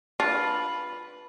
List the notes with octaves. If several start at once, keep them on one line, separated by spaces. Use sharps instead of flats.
D4 F4 B4